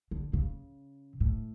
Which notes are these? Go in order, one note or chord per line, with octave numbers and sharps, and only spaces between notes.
D3
C#3
A2